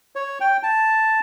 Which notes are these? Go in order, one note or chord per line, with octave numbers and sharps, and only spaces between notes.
C#5
G5
A5